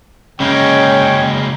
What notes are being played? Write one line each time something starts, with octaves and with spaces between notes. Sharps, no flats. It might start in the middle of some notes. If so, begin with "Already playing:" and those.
C#3 G#3 A#3 C#4 C#5 G5